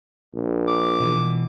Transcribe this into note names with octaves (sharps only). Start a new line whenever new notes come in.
A#1
D6
B2 E3